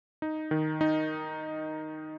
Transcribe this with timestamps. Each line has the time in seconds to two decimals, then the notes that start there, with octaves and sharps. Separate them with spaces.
0.22 D#4
0.51 D#3
0.81 D#4